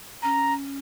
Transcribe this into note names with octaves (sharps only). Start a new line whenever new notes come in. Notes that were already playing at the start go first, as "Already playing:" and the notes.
C#4 A#5